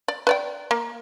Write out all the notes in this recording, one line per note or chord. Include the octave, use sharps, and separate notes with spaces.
D5
B4 D5 G5
A#3